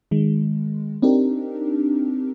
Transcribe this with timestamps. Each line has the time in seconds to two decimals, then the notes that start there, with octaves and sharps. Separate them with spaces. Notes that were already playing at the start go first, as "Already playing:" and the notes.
0.11 D#3 G#3
1.02 C4 D4 D#4 G4 A#4